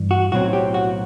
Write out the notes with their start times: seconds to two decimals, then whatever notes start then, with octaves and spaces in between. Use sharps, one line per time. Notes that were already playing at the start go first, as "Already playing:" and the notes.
Already playing: G2 E3
0.11 F#4
0.32 B1 A2 F#3 C4 F#4
0.53 G4
0.74 F#4